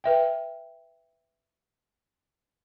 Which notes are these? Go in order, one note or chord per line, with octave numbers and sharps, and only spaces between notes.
B4 E5 G5